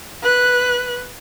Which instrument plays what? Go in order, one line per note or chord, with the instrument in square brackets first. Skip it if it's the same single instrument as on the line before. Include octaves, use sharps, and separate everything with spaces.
[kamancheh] B4 F#6